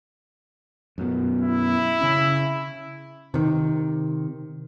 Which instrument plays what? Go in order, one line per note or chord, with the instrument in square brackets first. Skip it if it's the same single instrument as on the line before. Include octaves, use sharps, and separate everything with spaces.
[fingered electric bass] F#2 B2
[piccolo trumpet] E4
[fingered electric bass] C#3 C#4
[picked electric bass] C3 D#3